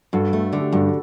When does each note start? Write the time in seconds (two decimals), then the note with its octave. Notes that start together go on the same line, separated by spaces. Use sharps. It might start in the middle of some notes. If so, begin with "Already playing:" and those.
0.13 G2 F#4 A4
0.33 A3
0.53 D3
0.60 G4
0.72 G2 F#4 A4